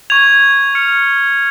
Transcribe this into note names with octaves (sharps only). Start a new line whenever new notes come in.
C#6 G#6 F7
F6 C#7 F7